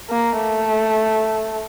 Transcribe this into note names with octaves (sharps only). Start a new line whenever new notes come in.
A#3
A3